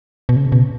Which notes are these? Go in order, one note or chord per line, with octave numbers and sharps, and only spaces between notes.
B2
C#3
B2